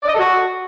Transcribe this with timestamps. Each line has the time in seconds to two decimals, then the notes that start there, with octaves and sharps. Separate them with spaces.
0.03 D5
0.08 D#5
0.14 A4
0.19 F#4